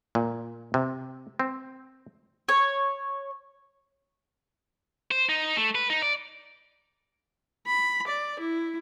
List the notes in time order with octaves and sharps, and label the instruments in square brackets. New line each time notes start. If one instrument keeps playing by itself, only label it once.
[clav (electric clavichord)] A#2
C3
C4
[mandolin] C#5
[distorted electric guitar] C5
D#4
A3
B4
D#4
D5
[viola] B5
D5
E4